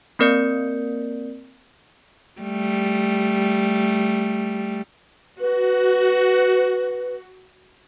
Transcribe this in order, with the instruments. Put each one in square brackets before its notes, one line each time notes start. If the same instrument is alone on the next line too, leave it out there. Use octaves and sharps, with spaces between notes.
[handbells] A#3 C4 A#4 D5 G6 C#7
[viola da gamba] G3 A3
[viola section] F#4 [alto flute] B4